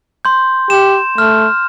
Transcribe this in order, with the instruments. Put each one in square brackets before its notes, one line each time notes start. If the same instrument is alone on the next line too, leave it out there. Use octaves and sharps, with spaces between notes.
[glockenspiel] C6 G6
[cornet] G4 [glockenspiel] E7
[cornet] A3 [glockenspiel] F6